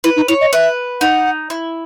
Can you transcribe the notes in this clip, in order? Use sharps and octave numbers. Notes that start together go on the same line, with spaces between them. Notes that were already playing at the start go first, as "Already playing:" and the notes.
E4 B4
D#4
E4 C#5
D#5
B4 E5
D#4 F#5
E4